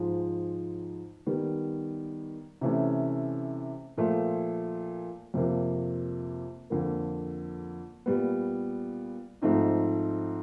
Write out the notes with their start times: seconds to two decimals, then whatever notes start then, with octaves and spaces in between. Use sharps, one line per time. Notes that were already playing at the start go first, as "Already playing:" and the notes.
Already playing: G#2 F3 G#3
1.26 D#3 G3 B3
2.61 C3 E3 A3 C#4
3.98 A#2 F3 A3
5.34 F2 C3 F3 A#3
6.70 F2 D3 F3 A#3
8.06 A#2 G3 B3
9.42 G#2 F3 A3 C4 D#4